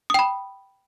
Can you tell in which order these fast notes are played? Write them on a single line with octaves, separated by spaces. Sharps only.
D#6 G5 B5